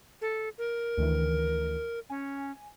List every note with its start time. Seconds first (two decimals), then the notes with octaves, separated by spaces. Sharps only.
0.21 A4
0.58 A#4
0.97 D2 D#3 E3
2.10 C#4 G#5